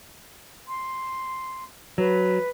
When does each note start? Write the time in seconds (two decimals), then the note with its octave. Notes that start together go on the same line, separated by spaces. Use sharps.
0.68 C6
1.98 F#3 B4